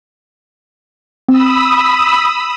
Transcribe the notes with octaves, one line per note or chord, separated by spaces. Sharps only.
C4 B5 D#6 E6